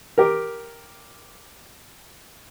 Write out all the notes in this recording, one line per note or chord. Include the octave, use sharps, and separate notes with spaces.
G4 A#4